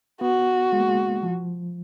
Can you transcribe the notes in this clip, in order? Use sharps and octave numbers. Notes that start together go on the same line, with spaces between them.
B3 F#4
G#3
A#3
G#3
F3